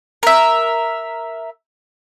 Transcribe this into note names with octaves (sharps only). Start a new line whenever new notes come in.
A#4 E5